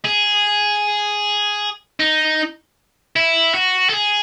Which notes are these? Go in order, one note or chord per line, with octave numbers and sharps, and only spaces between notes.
G#4
D#4
E4
F#4
A4
G#4